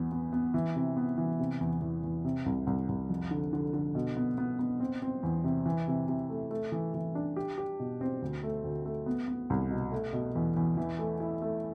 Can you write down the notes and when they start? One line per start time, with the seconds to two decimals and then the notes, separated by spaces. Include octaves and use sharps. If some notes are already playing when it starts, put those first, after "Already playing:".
Already playing: E2 B3
0.12 B3
0.33 B3
0.54 E3
0.76 C3
0.97 B3
1.18 E3
1.39 C3
1.61 E2
1.81 E2
2.04 E2
2.24 C3
2.46 C2
2.67 C2
2.89 C2
3.09 F2
3.31 D3
3.53 D3
3.73 D3
3.95 B2
4.17 B3
4.38 B3
4.59 B3
4.80 C4
5.02 C4
5.23 E2
5.44 C3
5.66 E3
5.88 C3
6.08 C3
6.30 A3
6.51 A3
6.72 E3
6.94 E3
7.15 D4
7.36 G4
7.58 G4
7.80 B2
8.01 C4
8.22 D2
8.43 A3
8.64 D2
8.85 A3
9.06 B3
9.28 B3
9.50 C2
9.71 B2
9.92 A3
10.13 B2
10.35 E2
10.56 E2
10.77 E3
10.99 A3
11.20 E4
11.42 A3